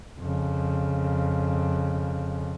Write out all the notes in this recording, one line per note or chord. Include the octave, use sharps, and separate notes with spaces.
F2 C#3